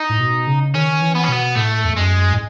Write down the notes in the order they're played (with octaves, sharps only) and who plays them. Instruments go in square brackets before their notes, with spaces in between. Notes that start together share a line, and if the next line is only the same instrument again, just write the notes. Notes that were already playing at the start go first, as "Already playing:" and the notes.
Already playing: [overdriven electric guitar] D#4
[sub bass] A2
B2
C#3
[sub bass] D#3 [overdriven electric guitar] C#4
[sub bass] E3
[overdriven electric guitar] B3
C#4
[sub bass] B2 [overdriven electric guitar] B3
[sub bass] A2 [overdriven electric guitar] A3
[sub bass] E2
[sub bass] F#2 [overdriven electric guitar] G#3
[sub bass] A2